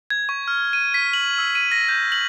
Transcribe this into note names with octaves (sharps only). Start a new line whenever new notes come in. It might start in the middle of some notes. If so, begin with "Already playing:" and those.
G#6
C#6
F6
D#7
B6
F#7
E6
D#7
A#6
G6
F#7